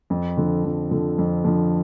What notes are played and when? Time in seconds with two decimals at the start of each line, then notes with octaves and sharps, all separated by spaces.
0.10 F2
0.37 D3 F3
0.65 F2
0.91 D3 F3
1.18 F2
1.45 D3 F3